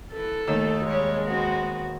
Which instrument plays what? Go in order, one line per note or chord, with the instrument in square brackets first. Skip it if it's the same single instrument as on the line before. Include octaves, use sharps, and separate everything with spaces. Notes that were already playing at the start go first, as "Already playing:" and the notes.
[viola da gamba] E3 [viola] A4
[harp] D#2 D#3 E6 [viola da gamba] A3
[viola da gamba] G3 C#5 [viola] G#3
[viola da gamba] B3 C4 F#4